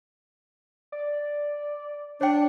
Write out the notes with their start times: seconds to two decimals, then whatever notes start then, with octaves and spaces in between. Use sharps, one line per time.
0.92 D5
2.21 D4 C#5 G5